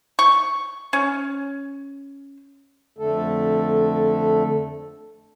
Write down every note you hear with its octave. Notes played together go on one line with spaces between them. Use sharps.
C#6
C#4
F2 D3 A3 A4